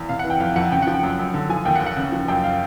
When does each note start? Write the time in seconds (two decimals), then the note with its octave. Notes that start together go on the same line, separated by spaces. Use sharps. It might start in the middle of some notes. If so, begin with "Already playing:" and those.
Already playing: E2
0.09 C3 F5
0.19 F#5
0.24 E3
0.30 G5
0.40 F2 F5
0.56 F2 F#5
0.71 C#3 G5
0.82 F3 F#5
0.94 G5
1.03 F#2
1.19 F#2
1.34 D3
1.49 F3 G#5
1.65 D#2 G5
1.75 F#5
1.81 D#2
1.86 F#5
1.97 C#3
2.12 F3
2.28 F#2 G5
2.44 F5